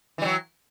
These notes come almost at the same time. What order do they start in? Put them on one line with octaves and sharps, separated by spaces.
E3 G3 F#3